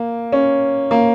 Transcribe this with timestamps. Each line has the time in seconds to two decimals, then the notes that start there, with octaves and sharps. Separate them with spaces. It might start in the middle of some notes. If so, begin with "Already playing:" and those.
Already playing: A#3
0.32 C#4
0.91 A#3